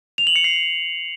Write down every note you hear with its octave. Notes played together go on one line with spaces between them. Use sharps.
F7
F#7
C#7
C7